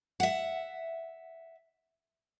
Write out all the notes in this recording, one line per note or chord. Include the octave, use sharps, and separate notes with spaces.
E5 F#5